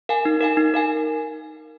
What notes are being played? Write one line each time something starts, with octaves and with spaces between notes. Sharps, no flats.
A#4 F5 G#5
D#4
A#4 F5 G#5
D#4
A#4 F5 G#5